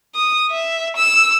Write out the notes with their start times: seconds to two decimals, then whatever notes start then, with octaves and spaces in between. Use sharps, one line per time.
0.15 D#6
0.51 E5
0.96 E6